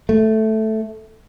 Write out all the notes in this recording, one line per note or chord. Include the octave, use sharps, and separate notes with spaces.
A3